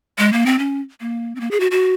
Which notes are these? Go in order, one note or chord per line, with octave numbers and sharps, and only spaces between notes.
G#3
A#3
C4
C#4
A#3
C4
A#3
G#4
F#4
F#4